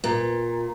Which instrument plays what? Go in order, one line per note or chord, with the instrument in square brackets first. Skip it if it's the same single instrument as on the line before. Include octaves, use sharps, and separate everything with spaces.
[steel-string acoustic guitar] A#2